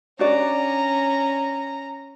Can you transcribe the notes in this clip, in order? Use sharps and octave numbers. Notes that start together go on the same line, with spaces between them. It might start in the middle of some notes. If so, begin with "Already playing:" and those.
C#4 D4 F#4 D5 A#5